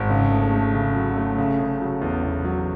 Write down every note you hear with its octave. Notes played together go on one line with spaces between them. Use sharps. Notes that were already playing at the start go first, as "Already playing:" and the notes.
Already playing: G#1
C#3
A3
A3
C#3
F#3
A3
C#3
C#3
F#3
E2
E2
F#3